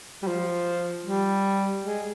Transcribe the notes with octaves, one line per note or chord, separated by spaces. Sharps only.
G3
F3
G3
G#3